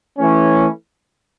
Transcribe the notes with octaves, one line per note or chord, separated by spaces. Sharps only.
E3 A3 C#4